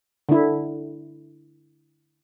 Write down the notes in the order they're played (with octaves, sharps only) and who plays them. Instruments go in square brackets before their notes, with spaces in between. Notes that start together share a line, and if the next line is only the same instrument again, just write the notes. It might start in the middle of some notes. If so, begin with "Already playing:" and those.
[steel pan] D3 E4